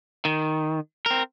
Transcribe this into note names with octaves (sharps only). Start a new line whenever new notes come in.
D#3
C4 A#4